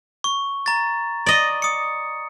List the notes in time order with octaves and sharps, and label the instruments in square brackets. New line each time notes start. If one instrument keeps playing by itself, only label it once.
[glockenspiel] C#6
A#5 A6
[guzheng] D5 D#5
[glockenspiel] D#6 C#7